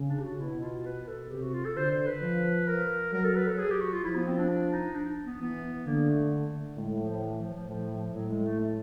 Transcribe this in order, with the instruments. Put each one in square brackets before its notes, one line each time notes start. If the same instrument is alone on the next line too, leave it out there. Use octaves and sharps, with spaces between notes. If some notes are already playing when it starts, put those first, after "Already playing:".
Already playing: [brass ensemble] C#3
[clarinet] D4
G4
F#4
[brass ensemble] B2 [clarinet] E4
[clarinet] F4
B4
A4
[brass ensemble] C3 [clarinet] G4
[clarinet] F#4
F4
A4
[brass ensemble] D3 [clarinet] C5
[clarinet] C5
B4
[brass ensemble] F3
[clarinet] A#4
[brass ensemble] F#3 [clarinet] A#4
[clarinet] A4
B4
A4
G#4
G4
F#4
F4
[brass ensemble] F3 [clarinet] E4
[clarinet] B3
C4
D4
D4
D#4
D4
B3
[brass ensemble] E3 [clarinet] B3
[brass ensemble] D3 [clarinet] A#3
[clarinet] A3
[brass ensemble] A2 [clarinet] G#3
[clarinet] F3
E3
F3
F3
[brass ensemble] A2 [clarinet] F3
[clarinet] F3
[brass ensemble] A2 [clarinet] F#3
[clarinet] G#3
A3
A3